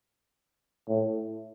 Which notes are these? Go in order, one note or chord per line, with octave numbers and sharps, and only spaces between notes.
A2